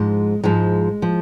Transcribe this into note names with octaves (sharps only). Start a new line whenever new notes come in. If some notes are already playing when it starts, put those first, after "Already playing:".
Already playing: G#2 F3 G#3
G#2 F3 G#3
F3